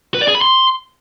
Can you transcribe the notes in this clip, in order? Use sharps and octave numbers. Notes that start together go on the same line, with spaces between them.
B4
D5
G#4
B5
C6